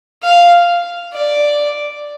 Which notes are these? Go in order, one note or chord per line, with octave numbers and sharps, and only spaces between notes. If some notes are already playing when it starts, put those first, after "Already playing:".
F5
D5